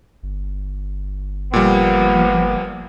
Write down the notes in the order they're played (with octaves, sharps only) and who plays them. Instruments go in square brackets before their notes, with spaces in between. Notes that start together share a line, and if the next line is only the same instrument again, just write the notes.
[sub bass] G1
[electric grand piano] A#2 G3 [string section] F3 A#3 [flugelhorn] B3